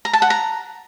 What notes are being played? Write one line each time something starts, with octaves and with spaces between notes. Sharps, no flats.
A#5
A5
F#5
A#5